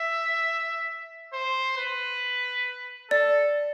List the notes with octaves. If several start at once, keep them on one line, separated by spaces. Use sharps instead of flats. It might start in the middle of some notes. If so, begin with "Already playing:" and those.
Already playing: E5
C5
B4
A4 D5